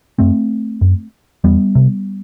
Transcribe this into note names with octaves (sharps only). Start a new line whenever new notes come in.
F#2 A3 C4
F#2
E2 G3 B3
C3